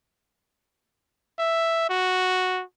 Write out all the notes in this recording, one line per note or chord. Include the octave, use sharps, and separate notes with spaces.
E5
F#4